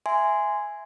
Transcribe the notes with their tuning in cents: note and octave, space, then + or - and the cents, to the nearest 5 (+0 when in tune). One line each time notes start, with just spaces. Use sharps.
E5 +0 G#5 +0 C6 -15